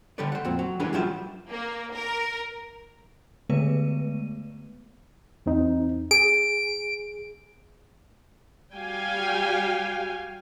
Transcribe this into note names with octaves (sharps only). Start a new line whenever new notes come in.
D3 G3 G4 A4 B4 D5
C5 F#5
F2 A#2 C4
F#3
E3 G3 C#4 D4 G#4 A#4
G2 F#3 G3 F4 C5 E5
A#3
A#4
D3 G#3 A3 B3 B4 D#7
E2 C4 D#4
G#4 D7
G3 F#4 F5 G5 G#5